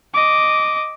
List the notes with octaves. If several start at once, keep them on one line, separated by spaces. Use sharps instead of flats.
D#5 D6